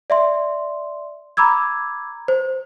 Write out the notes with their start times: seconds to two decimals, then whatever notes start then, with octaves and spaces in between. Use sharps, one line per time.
0.10 D5 E5 C6
1.37 A#5 B5 D6 E6 G#6
2.28 C5